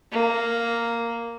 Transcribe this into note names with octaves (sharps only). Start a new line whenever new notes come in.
A#3